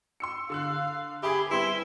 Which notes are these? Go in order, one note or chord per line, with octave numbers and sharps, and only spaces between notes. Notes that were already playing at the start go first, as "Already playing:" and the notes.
C6 E6 C#7
D3 F5 E6 F#6
G4 G#4 E5 B5 D#6 G#6
G3 C4 E4 B4 E5 C6